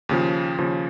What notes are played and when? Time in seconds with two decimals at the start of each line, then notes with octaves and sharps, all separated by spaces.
0.09 D#2 C#3 F3
0.58 D#2 C#3 F3